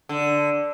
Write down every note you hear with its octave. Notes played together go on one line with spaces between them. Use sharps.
D3